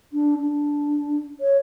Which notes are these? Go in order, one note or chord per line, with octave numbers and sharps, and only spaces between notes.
D4
D4
C#5